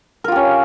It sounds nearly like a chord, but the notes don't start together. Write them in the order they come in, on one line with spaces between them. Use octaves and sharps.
A#4 F4 G4 C#4